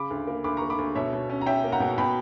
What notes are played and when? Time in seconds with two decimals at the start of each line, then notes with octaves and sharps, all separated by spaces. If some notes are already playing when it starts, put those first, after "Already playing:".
Already playing: C#3 B5 D6
0.10 D2
0.27 A#3
0.44 D2 B5 D6
0.57 A#3 A#5 C#6
0.70 B5 D6
0.78 D2
0.95 B2 C#5 E5
1.13 B2
1.30 C#4
1.41 A#5
1.46 C#4 E5 G5
1.64 A#3
1.72 F#5 A#5
1.80 B2
1.98 B2 G5 B5